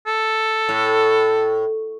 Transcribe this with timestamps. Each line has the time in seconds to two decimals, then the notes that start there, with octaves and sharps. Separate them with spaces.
0.07 A4
0.69 A2